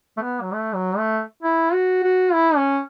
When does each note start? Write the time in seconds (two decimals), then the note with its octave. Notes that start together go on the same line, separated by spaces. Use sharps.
0.17 A3
0.22 B3
0.41 F#3
0.52 A3
0.74 F#3
0.97 A3
1.42 E4
1.73 F#4
2.03 F#4
2.33 E4
2.56 C#4